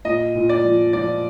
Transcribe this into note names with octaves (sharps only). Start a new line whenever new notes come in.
A#2 D#5
A#2
D5
F3
F3 D5